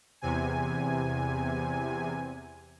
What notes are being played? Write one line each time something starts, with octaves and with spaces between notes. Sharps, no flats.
E2 C3 G#5